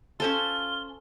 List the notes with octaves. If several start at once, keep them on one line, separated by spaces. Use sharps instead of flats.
C#4 F4 A4 C5 G#5 G7